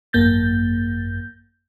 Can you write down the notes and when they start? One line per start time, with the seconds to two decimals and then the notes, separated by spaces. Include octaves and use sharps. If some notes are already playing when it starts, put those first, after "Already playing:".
0.13 G#1 F#2 A#3 G6 A6